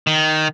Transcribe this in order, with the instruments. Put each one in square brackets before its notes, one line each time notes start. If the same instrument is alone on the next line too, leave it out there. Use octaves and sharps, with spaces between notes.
[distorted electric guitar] D#3